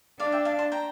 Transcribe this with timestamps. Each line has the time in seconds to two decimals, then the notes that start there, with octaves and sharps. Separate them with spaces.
0.19 D4 D5 F5
0.32 E5 G5
0.45 F5 A5
0.59 A5 C6
0.72 G5 A#5